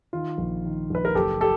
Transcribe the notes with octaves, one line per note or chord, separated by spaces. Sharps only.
D#3 F4
A#1
D#3
A#1 B4
A#4
F#1 G4 A4
G4 A4